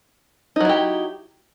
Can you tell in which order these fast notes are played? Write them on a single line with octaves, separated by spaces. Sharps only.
D#4 F#3 E4 G4